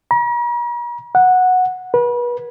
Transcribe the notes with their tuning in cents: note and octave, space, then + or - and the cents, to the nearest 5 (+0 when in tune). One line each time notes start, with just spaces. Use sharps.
A#5 +45
F#5 -10
B4 -35